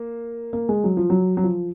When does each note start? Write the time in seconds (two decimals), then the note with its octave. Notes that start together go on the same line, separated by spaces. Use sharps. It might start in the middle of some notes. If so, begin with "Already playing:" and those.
Already playing: A#3
0.53 A#3
0.69 G#3
0.84 F#3
0.97 F3
1.10 F#3
1.37 F#3
1.44 F3